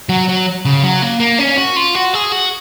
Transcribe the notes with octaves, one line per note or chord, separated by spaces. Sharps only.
F#3
F#3
C#3
F#3
A#3
A#3
C#4
F#4
F4
F#4
G#4
F#4